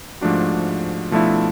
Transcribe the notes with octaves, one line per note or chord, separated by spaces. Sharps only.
G#2 F3 A3 D4 F#4
B2 F3 A3 D4 E4